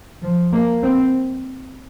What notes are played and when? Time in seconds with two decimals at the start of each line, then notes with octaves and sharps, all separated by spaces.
0.23 F3
0.53 A#3
0.83 C4